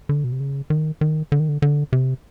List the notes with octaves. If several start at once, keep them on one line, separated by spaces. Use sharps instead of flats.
D3
B2
C3
C#3
D#3
D#3
D3
D#3
D3
D3
C3